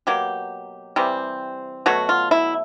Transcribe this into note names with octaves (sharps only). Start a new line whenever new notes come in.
B2 F#3 A#3 G4
C3 E3 G3 C4
B2 F#3 A3 F#4
F4
E4